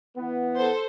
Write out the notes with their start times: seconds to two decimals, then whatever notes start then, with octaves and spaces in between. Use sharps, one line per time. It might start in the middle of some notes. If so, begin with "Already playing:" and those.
0.17 E3 B3
0.56 A4 C5